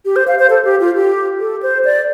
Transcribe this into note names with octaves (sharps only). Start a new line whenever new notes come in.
G4
C5
F5
C5
A4
G4
F4
G4
A4
C5
D5